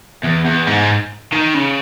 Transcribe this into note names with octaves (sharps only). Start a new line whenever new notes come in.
E2
E2
G#2
D#3
C#3